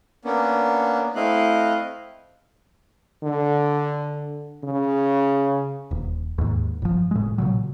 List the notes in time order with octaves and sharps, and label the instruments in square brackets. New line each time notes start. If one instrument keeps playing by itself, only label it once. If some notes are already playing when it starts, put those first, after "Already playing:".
[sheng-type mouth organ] A#3 B3 C#4 D4
A3 C4 E4 D#5 F5 F#6
[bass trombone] D3
C#3
[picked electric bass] D#1
D#2 G#2
G1 F3
A2 G#3
A#2 C#3 F#3